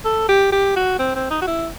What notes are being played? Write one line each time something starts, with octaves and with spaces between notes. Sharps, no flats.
A4
G4
G4
F#4
C4
C4
D#4
F#4
E4